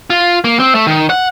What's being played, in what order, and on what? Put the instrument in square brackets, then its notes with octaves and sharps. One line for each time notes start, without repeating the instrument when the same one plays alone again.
[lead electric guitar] F4
A#3
C4
A3
D#3
F#5